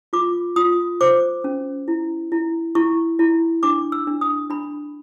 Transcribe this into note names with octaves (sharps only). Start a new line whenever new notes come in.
F4 D6
F4 D#6
C5 D6
C#4
E4
E4
E4 C#6
E4
D4 D6
E6
D4
D#6
D4 B5